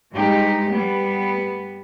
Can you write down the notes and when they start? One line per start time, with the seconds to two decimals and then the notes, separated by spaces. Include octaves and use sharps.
0.13 G2 G#3 D#4 G4
0.70 G3 B3